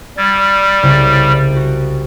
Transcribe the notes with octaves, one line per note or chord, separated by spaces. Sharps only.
G3 E6 G#6 A6
C2 C#3
F#4